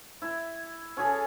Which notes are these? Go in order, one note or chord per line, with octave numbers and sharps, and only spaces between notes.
E4
C#4 G#4 A4